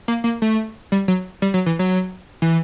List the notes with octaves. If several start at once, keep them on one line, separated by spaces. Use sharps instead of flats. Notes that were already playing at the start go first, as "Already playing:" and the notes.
A#3
A#3
A3
G3
F#3
G3
F#3
E3
F#3
E3